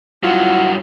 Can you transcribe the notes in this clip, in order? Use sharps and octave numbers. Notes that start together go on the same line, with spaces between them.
G2 F#3 E4 F4 F#5